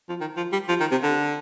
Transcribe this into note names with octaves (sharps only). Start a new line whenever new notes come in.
F3
D#3
F3
G3
F3
D#3
C3
D3